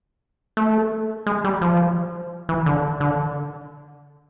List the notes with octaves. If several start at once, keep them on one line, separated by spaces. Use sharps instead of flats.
A3
G#3
G3
F3
E3
D3
D3